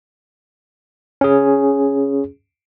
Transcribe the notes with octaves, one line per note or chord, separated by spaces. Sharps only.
C#4 G#4